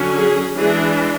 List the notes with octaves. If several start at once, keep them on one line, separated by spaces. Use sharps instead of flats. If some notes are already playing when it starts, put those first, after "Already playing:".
Already playing: D3 F#3 C#4
G#4
E3 G#3 D4 G#4